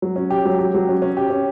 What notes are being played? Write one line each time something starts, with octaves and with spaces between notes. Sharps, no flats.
F#3
C#4
G4
F#3
G4
F#3
C#4
C#4
G4
C#4